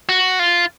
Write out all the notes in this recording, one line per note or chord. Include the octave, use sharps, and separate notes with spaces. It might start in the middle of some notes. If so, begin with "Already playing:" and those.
F#4
F4